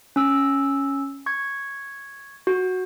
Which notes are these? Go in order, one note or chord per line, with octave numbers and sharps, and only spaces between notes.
C#4 E6
C#6 G#6
F#4